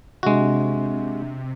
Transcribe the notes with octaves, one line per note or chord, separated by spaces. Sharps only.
C3 G#3 D4 F#4 E5